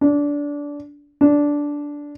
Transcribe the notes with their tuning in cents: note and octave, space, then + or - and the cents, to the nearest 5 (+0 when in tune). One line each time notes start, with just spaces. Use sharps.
D4 -20
D4 -10